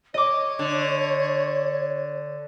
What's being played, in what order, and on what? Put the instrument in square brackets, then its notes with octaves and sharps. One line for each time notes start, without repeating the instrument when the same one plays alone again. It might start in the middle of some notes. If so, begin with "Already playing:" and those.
[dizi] C#5 [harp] D#5 D6
[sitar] D3